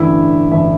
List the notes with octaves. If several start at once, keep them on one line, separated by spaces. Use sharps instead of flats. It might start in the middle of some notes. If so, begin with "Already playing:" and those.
Already playing: A1 G2 D3 E4 E5
A1 G2 D3 E4 E5